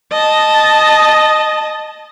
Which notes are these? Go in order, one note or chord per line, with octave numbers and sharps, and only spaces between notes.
D#5 A5